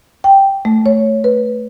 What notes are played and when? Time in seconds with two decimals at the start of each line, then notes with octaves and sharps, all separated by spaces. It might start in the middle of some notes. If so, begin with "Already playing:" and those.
0.24 G5
0.65 A3
0.86 C#5
1.24 B4